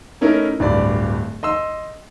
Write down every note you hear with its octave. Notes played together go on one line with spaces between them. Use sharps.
A3 C#4 D#4 E4 A#4
D1 G2 D5 B5
D#5 C6 E6